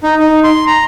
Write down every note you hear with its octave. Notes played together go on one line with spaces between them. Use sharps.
D#4
D#4
C6
A#5